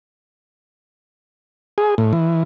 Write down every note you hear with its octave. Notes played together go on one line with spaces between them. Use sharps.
G#4
A2
E3